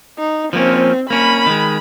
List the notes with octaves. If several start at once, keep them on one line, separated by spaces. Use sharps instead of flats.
D#4
F3 A#3 C4 C#4
A#3 C#4 B5
D#3 G#3